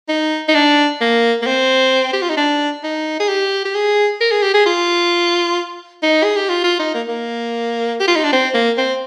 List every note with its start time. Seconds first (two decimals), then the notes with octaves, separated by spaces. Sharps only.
0.09 D#4
0.48 D#4
0.54 D4
1.01 A#3
1.42 A#3
1.47 C4
2.13 G4
2.22 F4
2.30 D#4
2.37 D4
2.84 D#4
3.20 G#4
3.29 G4
3.65 G4
3.75 G#4
4.20 A#4
4.32 G#4
4.42 G4
4.54 G#4
4.66 F4
6.03 D#4
6.24 G#4
6.37 G4
6.49 F4
6.64 F4
6.79 D#4
6.95 A#3
7.08 A#3
8.00 G4
8.08 F4
8.16 D#4
8.24 D4
8.32 C4
8.54 A#3
8.78 C4